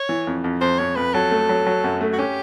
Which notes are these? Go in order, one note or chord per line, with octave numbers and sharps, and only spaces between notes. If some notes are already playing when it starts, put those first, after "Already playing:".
Already playing: C#5
E3
F2
F2
F2 C5
F2 C#5
F2 B4
F#3 A4
A3
F#3
F#3
F#2
A3
F#4
C#4 G4